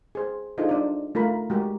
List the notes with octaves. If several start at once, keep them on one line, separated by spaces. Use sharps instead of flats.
G#4 C5
D4 D#4 F4 G#4 A4 C5
D4 D5
A3 F4 A#4 B5
G#3 F#4 G4 A#4